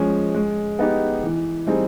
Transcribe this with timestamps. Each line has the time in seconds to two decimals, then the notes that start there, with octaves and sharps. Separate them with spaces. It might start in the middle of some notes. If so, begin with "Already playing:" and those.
Already playing: F3 G#3 C#4
0.35 G#3
0.79 B3 D#4 G4
1.23 E3
1.67 G3 C4 D#4 G#4